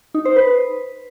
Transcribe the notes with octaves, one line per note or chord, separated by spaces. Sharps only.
D#4
C5
B4